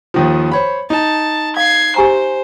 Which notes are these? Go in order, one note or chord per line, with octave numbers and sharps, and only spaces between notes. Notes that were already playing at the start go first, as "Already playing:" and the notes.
D#2 D#3 F3
C5 C#5 B5
D#4 A5
F5 G#6 C7
G4 C5 G#5 A#5